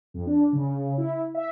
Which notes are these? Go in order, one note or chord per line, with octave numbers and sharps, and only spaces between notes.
F2
D4
C#3
E4
E5